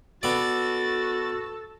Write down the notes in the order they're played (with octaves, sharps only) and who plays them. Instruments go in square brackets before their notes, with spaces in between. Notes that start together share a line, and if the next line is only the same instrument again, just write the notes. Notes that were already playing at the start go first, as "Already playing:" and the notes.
[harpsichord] B3 D5 [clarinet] F#4 [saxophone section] A4 [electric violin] A6